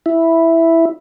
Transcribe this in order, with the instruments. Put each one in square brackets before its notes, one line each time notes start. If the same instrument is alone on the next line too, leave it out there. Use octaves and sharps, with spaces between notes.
[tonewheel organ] E4